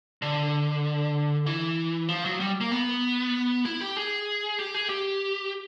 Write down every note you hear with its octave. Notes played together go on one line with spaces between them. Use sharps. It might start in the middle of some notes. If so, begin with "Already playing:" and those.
D3
E3
F3
F#3
G3
A#3
B3
E4
G4
G#4
G4
G#4
G4